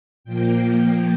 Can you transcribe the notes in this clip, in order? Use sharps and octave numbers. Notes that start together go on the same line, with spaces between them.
A#2 F3 A#3 G5